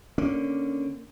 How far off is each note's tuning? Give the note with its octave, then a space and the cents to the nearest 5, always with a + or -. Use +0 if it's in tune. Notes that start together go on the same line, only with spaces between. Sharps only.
D3 +0 A#3 +5 C#4 +0